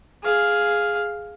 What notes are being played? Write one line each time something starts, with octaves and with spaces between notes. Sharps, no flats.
G#4 F5